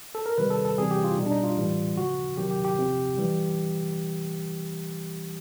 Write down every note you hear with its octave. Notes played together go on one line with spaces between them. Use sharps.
A4
A#4
C3 D#3 G3 B4
A4
A4
C3 E3 G3 G#4
G4
F4
B2 G3 D#4
D4
D#4
F4
A2 E3 G3
C#3 F3 F#4
C3 D#3 F#3 G4
G4
G4
C3 F3
E3 G3